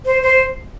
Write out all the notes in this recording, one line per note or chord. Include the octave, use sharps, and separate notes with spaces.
C5
C5